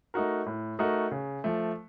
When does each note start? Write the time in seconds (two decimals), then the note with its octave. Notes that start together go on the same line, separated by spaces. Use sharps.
0.14 A3 D#4 F#4 A#4
0.46 A2
0.79 A3 D#4 F#4 A#4
1.11 C#3
1.44 F3 A3